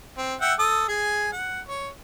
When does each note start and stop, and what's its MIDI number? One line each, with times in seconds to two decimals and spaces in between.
0.18 0.35 60
0.41 0.54 76
0.41 0.54 78
0.41 0.54 79
0.59 0.86 69
0.59 0.86 87
0.88 1.32 68
0.88 1.32 80
1.32 1.60 78
1.68 1.90 73